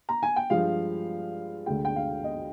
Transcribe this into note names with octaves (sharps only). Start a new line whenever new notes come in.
A#5
G#5
G5
G2 F3 G#3 F5
D2 D3 G#3 G5
G5
F5
D#5